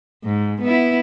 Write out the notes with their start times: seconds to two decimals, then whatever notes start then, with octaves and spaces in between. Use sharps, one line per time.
0.25 G#2
0.61 B3 E4